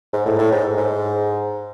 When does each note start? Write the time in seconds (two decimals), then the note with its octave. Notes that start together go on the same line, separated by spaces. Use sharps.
0.13 G#2
0.26 A2
0.39 A2
0.52 G#2
0.77 G#2